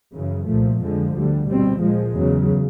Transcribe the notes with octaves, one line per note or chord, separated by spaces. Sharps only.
F#2 C#3 E3
C2 A#2 F3 A3
F2 D3 F3 G#3
D2 D3 G3
B2 G3 C4
A#2 F3 G#3
E2 C#3 F#3